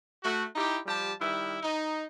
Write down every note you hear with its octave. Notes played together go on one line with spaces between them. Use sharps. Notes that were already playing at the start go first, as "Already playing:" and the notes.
A3 F#4
D#4 E4 G4
F3 G3 G4 A5
D#3 G3 E4
D#4